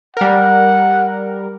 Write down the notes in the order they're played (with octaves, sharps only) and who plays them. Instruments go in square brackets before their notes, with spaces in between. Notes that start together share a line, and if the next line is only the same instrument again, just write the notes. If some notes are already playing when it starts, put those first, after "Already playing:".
[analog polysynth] G3 A#4 [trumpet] F#5